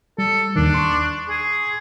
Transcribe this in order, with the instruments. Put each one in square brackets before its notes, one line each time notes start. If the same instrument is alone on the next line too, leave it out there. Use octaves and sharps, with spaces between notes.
[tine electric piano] G3 [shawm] A4
[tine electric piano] D#2 D#3 [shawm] D4
[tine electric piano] C6 C#6
[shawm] G#4